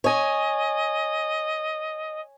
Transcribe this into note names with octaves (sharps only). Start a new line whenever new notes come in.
C#5 D#5 G#5